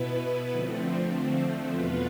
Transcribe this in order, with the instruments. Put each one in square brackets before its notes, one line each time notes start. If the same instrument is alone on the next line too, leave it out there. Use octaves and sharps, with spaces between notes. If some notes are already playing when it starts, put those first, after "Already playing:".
Already playing: [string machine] B2 B3 E4 B4
D3 F3 A3 C4
E2 B2 B3 F4 B4